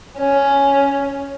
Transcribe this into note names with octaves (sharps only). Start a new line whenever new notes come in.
C#4